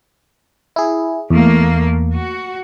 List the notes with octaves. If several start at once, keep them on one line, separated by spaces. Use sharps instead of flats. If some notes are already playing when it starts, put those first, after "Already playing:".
E4 G#4
E2 A3 A#3
F#4